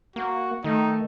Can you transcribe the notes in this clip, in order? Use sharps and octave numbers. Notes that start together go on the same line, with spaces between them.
A#3 F#4
D#3 A3 D#4